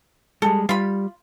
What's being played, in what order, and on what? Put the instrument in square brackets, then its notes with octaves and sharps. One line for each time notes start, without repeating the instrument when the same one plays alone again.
[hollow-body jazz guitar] G3 G#3 [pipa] A4
[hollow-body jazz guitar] G3 [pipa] F4 B5